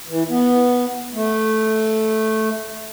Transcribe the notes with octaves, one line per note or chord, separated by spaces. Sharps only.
E3
B3
A3